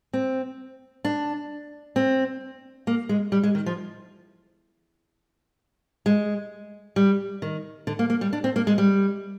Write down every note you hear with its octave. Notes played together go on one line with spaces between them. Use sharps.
C4
D4
C4
A#3
G#3
G3
G#3
D#3
F3
G#3
G3
D#3
D3
A#3
A#3
G3
D4
C4
A#3
G#3
G3